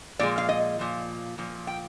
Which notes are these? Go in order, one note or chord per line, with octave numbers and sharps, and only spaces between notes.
A#2 F3 G#3 D5
F5
D#5
A#2 F3
A#2 F3
G5